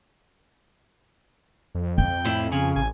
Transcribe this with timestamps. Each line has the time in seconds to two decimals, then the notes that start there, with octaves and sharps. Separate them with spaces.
1.75 F2
1.98 C4 G5
2.25 A2 E4
2.52 C#3 G#5
2.76 A1 G#5